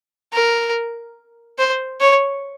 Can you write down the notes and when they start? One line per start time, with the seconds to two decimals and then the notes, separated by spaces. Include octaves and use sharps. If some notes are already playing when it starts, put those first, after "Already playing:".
0.33 A#4
1.58 C5
2.00 C#5